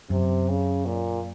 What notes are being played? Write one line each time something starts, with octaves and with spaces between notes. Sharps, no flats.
F#2 C3
C#3
A#2